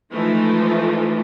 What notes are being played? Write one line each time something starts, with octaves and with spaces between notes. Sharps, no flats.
E3 F3 G#3 A3 D#4